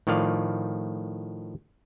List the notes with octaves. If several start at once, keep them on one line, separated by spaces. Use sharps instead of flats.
A2 D#3 F3 D5 F5